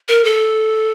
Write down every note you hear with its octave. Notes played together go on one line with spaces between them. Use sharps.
A#4
A4